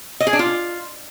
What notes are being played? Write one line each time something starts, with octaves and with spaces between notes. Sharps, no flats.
D#5
G#4
D4
F4